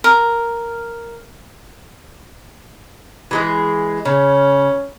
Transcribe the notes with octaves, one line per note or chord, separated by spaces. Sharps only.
A#4
E3 G#3 G#4
C#3 C#4